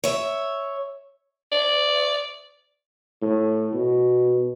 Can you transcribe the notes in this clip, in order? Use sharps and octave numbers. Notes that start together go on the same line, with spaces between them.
C#5 E5
D5
A2
B2